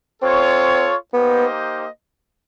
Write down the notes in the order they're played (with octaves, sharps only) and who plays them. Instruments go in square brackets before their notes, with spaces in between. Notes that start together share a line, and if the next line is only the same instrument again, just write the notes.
[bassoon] C4 [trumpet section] F4 A4 C#5
[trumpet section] A#3 D#4 G4 C5 D#5 [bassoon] B3